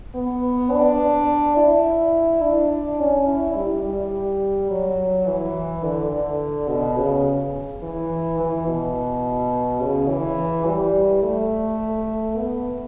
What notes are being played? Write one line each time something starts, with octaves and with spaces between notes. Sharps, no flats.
B3
D4
E4
D4
C#4
E4
G3
G3
F#3
E3
D3
D3
B2
C#3
E3
E3
B2
C#3
E3
G3
A3
B3